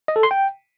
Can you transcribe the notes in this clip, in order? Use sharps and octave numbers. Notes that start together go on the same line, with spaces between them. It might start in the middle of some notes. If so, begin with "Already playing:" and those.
D#5
A4
C6
G5